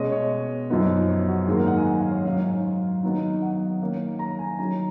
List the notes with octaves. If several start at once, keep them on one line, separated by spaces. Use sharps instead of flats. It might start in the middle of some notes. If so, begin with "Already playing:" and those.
Already playing: B2 G#3 C#4 D#5
C#5
F#2 F3 B3 D#4
C#5
F#4
G#2 D#3 F#3 A#3 G#4
A#4
F#5
G#5
F#5
F5
C#5
G#2 F#3 C#4 F5
F5
D#3 F#3 B3 D#4
F#5
D#3 A#3 C#4
A#5
G#5
D#3 F#3 C#4 A#5